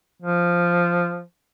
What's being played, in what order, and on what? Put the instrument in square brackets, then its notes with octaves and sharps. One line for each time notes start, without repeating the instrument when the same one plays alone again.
[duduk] F3